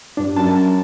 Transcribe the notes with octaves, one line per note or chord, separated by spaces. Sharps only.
G2 D4
F#2 A5